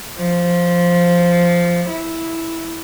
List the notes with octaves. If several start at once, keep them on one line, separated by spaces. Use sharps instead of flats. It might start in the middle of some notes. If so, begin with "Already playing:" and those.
F3
E4